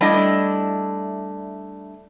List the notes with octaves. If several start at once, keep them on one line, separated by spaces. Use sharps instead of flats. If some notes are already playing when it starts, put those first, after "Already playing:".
G3 A3 D4 E4 D#5